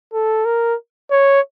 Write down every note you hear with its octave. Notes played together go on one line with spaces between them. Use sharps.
A4
A#4
C#5